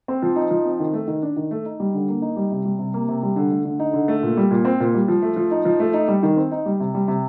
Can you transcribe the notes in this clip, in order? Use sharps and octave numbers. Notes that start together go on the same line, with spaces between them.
C4
F3
D#4
F3
C4
D#3
A3
D#3
D4
D#3
A3
D#4
G3
D3
A#3
D#4
G3
C3
G3
C3
A#3
C3
G3
D3
A3
D3
D#4
D3
A3
A#2
G3
A#2
C4
A#2
G3
F3
A3
F3
D#4
F3
A3
D#4
G3
D#3
C4
D#4
G3
C3
G3
C3